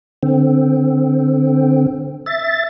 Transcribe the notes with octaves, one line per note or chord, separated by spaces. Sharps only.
D3 C4
E5 A6